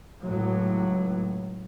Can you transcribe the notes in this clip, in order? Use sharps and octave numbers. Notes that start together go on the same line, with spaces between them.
C#2 A2 F#3